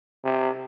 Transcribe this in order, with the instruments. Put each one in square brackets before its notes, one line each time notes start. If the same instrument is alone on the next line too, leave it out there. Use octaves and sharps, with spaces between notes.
[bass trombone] C3